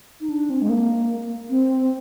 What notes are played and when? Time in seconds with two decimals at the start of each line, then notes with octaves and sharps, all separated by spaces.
0.21 D#4
0.29 D4
0.50 C4
0.62 G#3
0.69 A#3
1.50 C4